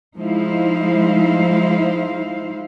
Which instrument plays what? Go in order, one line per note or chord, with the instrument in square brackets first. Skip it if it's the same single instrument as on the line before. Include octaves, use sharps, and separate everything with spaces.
[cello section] F3 G#3 D#4 E4 C5 F5